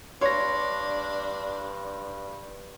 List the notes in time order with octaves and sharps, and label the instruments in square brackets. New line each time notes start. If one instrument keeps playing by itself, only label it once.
[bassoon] G2 [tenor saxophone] D4 [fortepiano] C#5 [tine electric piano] C6 A#6